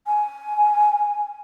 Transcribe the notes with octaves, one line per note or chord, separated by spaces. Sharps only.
G#5